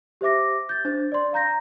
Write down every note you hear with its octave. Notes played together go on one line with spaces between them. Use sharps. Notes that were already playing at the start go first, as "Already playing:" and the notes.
G4 C5 E5 D6 A#6
G6 A6
D4 C5 A6
D5 C6
F5 A#5 G6 A#6